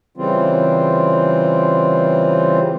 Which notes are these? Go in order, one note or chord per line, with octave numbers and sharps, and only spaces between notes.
C#3 E3 G3 C4 F4